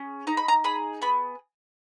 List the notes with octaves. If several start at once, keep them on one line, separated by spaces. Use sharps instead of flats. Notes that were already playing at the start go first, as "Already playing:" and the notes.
Already playing: C#4 G#4
D#4 A#5
B5
A#5
G#4 B5
B3 B5